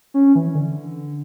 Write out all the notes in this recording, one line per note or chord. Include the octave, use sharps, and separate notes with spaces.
C#4
E3
D3